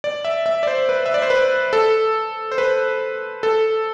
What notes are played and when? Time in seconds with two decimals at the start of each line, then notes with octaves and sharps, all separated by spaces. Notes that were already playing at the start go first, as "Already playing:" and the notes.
0.04 D5
0.25 E5
0.46 E5
0.63 D5
0.67 C5
0.89 B4
1.06 E5
1.14 D5
1.22 C5
1.30 B4
1.73 A4
2.52 C5
2.58 B4
3.43 A4